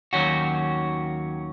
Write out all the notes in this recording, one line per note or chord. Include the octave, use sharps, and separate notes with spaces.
D#2 D#3 F#3 C#4 F#4